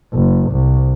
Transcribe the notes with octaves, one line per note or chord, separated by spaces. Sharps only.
F#1
C2